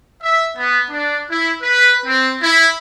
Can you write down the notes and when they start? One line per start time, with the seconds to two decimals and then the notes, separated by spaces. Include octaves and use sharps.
0.23 E5
0.57 B3
0.90 D4
1.31 E4
1.62 B4
2.06 C4
2.42 E4